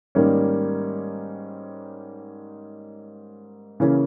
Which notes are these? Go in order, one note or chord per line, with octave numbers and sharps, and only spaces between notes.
G#2 D#3 G3 A#3 C#4
C#3 E3 A#3 C#4